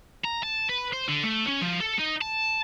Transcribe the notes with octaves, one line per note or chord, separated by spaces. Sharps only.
A#5
A5
B4
C5
D3
A3
C#4
F3
A4
D#4
A5